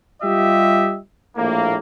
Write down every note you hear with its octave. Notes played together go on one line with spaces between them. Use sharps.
G3 F4 G4 D#5 E5
A#1 A2 A#3